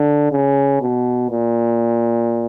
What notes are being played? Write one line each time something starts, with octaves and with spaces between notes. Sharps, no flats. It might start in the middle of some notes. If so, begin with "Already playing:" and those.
Already playing: D3
C#3
B2
A#2